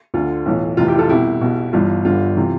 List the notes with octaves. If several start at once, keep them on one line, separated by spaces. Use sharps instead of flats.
D2 D3 F4
B1 A2 E3
F1 F2 C3 E3 F4
E4 G4
F4 A4
C2 B2 E4 G4
B1 B2
G1 G2 E3 F4
G1 G2 D3 F4
C3 E3